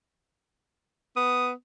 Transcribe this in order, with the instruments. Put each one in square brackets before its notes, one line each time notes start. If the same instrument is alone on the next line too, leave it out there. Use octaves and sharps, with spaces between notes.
[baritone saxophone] B3 [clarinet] D#6